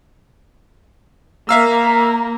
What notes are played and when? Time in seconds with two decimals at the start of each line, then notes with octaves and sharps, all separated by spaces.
1.49 A#3 E5 F5 A#5 E6